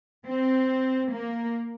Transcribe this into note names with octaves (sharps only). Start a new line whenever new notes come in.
C4
A#3